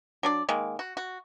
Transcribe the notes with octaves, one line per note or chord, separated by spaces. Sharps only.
F#3 D4 D5
D#3 G#3 A#3
F#4
F#4